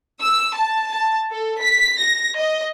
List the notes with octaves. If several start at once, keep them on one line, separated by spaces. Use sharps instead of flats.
E6
A5
A5
A4
B6
A#6
D#5